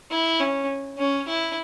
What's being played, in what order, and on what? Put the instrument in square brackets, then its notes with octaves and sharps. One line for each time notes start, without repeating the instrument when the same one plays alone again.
[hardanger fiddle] E4
C#4
C#4
E4